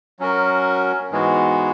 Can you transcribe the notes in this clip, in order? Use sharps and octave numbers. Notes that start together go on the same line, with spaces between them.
F#3 C#4 F#4 A#4
G#2 E3 G#3 B3 F#4